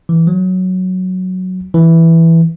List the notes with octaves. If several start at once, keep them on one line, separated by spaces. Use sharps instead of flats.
E3
F#3
E3